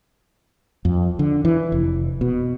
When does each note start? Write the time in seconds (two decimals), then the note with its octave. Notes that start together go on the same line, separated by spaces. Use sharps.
0.85 F2
1.19 D3
1.45 E3
1.72 F1
2.21 B2